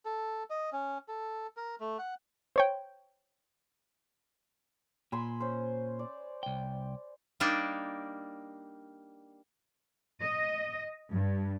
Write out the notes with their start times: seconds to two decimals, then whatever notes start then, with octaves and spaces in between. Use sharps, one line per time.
0.05 A4
0.50 D#5
0.72 C#4
1.08 A4
1.57 A#4
1.80 A3
1.99 F#5
2.56 C5 C#5 G5
5.12 A#2 G#5 B5 C6
5.41 C#4 C5
5.99 D5
6.43 C2 G5
7.40 G3 A#3 D4 D#4
10.21 D#5
11.12 G2